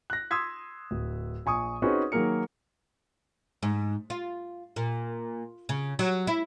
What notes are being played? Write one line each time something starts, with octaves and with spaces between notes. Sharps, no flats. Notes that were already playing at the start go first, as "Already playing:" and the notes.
F#6 A#6
C6 D#6 E6 G#6 B6
D1
A#1 G#5 C#6 D#6
C4 C#4 D#4 F#4 G#4 B4
D#3 F#3 A#3 G#4 A#4 C#7
G#2
F4
A#2
C#3
F#3
E4